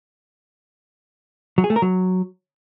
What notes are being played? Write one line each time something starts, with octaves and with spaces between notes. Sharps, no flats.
F#3
G#4
A3
A#4
F#3